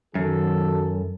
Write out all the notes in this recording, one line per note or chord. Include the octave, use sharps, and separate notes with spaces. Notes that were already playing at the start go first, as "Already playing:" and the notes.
F#2 D#3 F#3 A4